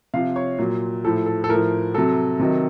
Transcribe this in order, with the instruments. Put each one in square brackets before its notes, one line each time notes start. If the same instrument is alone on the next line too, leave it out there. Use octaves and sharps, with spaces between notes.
[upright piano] C3 F3 F5
C#5
A#2 F#3
A2 F3 A4
A4
A4
A2 F3 A#4
C3 F#3 A4
C3 D#3 F#3